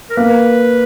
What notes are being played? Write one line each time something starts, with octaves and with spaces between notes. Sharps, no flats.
A#4
A#3 B4